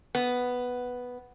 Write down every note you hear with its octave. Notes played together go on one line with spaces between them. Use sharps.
B3